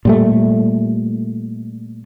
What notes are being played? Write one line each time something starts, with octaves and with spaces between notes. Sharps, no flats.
A#2 G3 A3